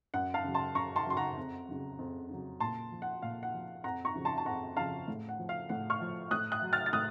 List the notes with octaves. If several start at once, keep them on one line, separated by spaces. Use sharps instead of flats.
F#2 F#5
F5 A5
C#3 F#3
A5 C6
F#2 A#5 C#6
A5 C6
C#3 F#3 C6
F#5 A#5
F2
C#3 F#3
F2
C#3 F#3
A#2 A5 C6
F3
F#5
A#2 F5
F#5
F3
F2 F#5 A#5
A#5 C#6
C#3 F3
A5 C6
A5
F2 F#5 A#5
C#3 F3 F5 A5
A2
F#5
F3
F5
A2 F#5
C#6 F6
F3
A2 D#6 F#6
D#6 F#6
F#3
F6 A6
A6
A2 D#6 F#6